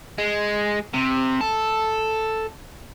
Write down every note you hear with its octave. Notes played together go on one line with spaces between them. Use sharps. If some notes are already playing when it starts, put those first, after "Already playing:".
G#3
C3
A4